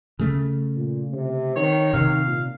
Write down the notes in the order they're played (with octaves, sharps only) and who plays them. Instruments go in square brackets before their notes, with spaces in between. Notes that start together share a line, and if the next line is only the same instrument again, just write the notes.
[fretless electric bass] C#3 A3
[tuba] A#2
C3
[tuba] D#3 [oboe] C#5
[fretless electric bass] C3 [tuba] D#3 [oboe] F5
[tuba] A#2